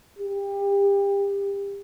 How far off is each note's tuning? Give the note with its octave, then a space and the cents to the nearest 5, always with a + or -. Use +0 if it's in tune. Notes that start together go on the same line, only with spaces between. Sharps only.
G4 +25